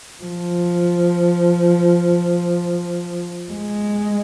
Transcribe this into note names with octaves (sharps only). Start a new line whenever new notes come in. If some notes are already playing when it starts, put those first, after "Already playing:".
F3
G#3